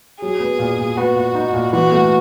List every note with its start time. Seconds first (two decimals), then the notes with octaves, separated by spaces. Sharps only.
0.22 F#3 G#4
0.40 B3
0.59 A#2
0.79 A#2
0.97 B3 F#4
1.16 A#2
1.35 D#4
1.54 A#2
1.72 E3 F#4
1.92 A3